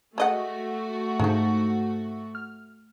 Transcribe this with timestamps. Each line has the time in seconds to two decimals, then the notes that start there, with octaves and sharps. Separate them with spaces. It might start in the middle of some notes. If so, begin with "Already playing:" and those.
0.18 G#3 A3 F#4 D#5 F#5
1.20 G#2 D3 F3 G#3 D#4
2.35 F6